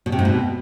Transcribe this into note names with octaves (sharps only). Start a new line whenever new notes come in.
B2
C3
G#2
B2